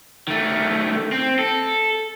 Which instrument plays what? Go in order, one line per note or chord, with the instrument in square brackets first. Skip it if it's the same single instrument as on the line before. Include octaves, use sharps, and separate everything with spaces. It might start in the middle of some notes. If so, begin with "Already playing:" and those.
[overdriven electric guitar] D#3 A3
C4
A4